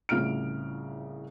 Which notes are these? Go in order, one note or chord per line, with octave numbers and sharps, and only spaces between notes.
C2 A2 C#3 F3 F6 D7